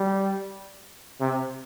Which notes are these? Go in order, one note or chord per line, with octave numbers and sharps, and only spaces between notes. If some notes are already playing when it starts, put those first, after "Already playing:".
Already playing: G3
C3